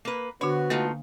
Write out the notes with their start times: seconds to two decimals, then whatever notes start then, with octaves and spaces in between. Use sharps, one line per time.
0.05 A#3 B4
0.41 D3 B3 D4 F#4 C#5
0.70 A3 A#3 D#4 F4 F5